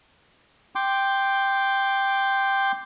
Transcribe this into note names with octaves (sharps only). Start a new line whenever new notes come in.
G5 C6 D6